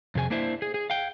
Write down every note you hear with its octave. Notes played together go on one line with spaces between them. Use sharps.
F2 C3 G#4 G#5
A#3 D4 E4 C5 E5
G#4
G#4
F5 G5